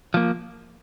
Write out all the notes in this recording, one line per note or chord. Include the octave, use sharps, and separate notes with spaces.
F3 A#3